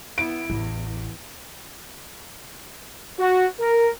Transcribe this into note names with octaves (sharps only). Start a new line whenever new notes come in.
B3 E4 D7
A1 E2
F#4
A#4